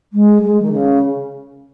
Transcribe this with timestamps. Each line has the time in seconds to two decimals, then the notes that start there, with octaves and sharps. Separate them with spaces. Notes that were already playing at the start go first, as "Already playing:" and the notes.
0.13 G#3
0.42 G#3
0.62 D#3
0.72 C#3